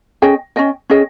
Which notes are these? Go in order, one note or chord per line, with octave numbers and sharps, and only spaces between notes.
C#4 G#4 D#5 G5
C#4 G#4 D#5 G5
C#4 G#4 D#5 G5